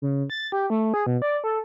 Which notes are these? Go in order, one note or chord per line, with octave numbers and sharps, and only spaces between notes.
C#3
A6
G4
A3
G#4
B2
D5
A4